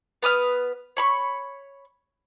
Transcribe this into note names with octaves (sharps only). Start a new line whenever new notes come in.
B3 B4 D#6 F6
C#5 B5 C#6